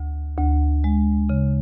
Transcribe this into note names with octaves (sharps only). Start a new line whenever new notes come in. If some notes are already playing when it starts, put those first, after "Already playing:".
Already playing: D2
D2
G#3
C#3